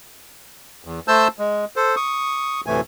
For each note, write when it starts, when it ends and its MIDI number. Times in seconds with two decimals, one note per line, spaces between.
0.85 1.00 40
1.08 1.28 57
1.08 1.28 72
1.08 1.28 81
1.08 1.28 88
1.08 1.28 91
1.39 1.65 56
1.76 1.95 69
1.76 1.95 72
1.96 2.61 85
1.96 2.61 87
2.66 2.81 38
2.66 2.81 45
2.66 2.81 48
2.66 2.81 52
2.66 2.81 57
2.66 2.81 80